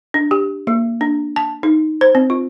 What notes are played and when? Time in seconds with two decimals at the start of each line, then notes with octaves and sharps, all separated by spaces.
0.14 D4
0.31 G4
0.67 A#3
1.01 D4
1.36 A5
1.63 D#4
2.01 C5
2.15 C4
2.30 F4